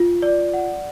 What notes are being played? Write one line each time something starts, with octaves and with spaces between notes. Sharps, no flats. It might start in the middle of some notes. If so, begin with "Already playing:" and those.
Already playing: F4
D5
F#5